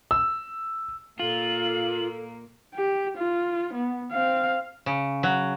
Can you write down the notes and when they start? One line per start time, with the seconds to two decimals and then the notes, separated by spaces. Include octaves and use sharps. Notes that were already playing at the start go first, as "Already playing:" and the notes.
0.11 E6
1.20 A#2 A#3 F4 A4 F#7
2.75 G4
3.18 F4
3.74 B3
4.12 C4 F5
4.86 C#3
5.23 F#3